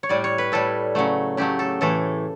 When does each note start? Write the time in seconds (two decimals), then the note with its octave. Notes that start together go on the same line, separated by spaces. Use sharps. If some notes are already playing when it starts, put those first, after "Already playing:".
0.03 C#5
0.09 A2 G3 D5
0.24 C#5
0.38 B4
0.52 A2 G3 A4
0.95 C#3 F#3 A3
1.37 C#3 F#3 A3 G4
1.59 A4
1.81 A2 E3 A3 A4